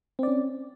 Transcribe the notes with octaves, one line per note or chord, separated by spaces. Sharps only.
C4 C#4 D5